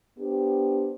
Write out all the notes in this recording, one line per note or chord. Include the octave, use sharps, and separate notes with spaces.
B3 D4 G4 C5